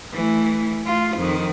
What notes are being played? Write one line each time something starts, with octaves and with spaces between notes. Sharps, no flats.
E3 A3
A3 F4
F2 D#3